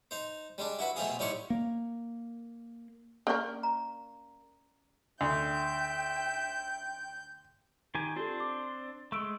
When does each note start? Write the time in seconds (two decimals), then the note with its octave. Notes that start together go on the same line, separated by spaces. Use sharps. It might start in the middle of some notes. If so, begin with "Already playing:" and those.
0.11 D#4 C5
0.58 G3 G#3 D4
0.79 E4 F#4 B4
0.96 B2 A3 C4 F4 G#4
1.19 A2 G3 D#4 E4 C6 C#6
1.50 A#3
3.27 A#3 C#4 A#4 D5 C#6
3.63 A#5
5.21 D2 E5 G5 G6
7.95 D#3 G4 G#5
8.16 C4 D4 F4 G4 A4 C5
8.40 D6
9.12 G#3 A3 C#6 E6 D7